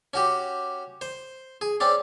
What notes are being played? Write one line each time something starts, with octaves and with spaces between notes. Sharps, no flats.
C#4 F#4 G4
C5
G#4
C4 C#4 D5